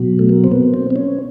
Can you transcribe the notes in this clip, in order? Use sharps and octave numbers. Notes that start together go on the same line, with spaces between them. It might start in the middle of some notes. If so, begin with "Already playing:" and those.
Already playing: B2 F#3
A3
A#3
C4
B3
C4
C4
C#4